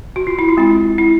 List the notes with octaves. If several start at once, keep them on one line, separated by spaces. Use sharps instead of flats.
F#4
F4
E4
F4
G#3 C4 E4
E4